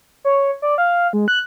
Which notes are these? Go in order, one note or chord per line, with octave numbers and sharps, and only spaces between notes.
C#5
D5
F5
G#3
F#6